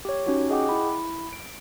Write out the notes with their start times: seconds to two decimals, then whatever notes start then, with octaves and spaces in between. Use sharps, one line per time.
0.05 G4 C#5
0.27 C#4 D#4 F#4 G4
0.50 G#4 D#5 F#5 G5 D6
0.69 E4 B5
1.33 D7